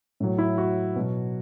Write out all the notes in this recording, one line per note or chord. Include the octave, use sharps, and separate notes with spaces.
A2 F#3
E4
F#4
B2 F#3